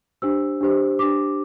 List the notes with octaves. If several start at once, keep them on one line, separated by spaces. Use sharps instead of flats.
D4 G4 C5 E6
D4 G4 C5
D4 G4 C5 D6